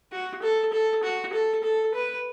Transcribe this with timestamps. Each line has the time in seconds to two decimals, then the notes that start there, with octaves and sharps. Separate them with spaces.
0.12 F#4
0.43 A4
0.73 A4
1.03 F#4
1.33 A4
1.63 A4
1.94 B4